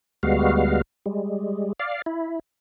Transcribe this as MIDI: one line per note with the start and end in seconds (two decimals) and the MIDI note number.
0.23 0.82 38
0.23 0.82 55
0.23 0.82 56
0.23 0.82 59
0.23 0.82 66
0.23 0.82 77
1.06 1.73 55
1.06 1.73 56
1.80 2.02 74
1.80 2.02 77
2.06 2.39 64